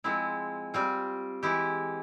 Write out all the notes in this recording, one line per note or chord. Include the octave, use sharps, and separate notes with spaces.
F3 G#3 C4 E4
G3 C4 F4
E3 G#3 E4 G4